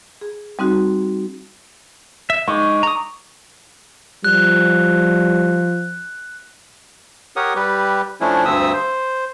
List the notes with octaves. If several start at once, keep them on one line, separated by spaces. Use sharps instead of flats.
G#4
G3 C4 D#4 F#4
E5
G#3 D#4 C#6 D6
A#5 D#6
F3 G3 F#6
G4 A#4 C#5 F#5 D#6
G3 G4 B4
F3 A3 C#4 D4 E4
D2 G2 C4 E5 D#6 E6
C5